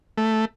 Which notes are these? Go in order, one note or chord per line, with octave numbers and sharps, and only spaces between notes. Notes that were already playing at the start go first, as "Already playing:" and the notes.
A3